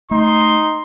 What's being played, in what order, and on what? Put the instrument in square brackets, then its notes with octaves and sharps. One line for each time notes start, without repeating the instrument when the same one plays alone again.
[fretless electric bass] A3 [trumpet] D#4 [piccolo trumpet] C6